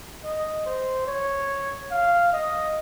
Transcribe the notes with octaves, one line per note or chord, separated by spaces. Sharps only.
D#5
C5
C#5
F5
D#5